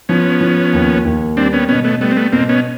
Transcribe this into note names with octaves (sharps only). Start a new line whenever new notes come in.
F3 B3 C#4
F3
D#2
D#2
G3 C4 D4
B3 C#4
B2 B3 C#4
A3 B3
G3 A3 B3
C4
A3 B3
B2 A#3 C4
B3 C#4